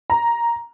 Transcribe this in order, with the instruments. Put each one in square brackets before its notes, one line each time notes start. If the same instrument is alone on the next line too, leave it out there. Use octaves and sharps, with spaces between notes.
[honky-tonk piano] A#5